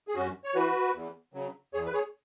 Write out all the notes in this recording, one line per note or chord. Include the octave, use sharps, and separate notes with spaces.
G#4
F#2 C#4 F#4
C#5
E3 F#4 B4
E2
C#3 F#3
E2 G#4 C#5
B4
G#4 C#5